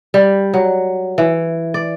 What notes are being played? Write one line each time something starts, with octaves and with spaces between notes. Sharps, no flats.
G3
F#3
E3
D5